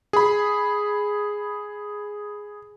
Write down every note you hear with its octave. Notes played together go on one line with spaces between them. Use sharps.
G#4 B5